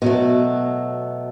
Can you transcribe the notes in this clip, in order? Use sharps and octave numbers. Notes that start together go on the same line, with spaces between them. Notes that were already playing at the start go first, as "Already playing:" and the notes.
B2 F#3 A3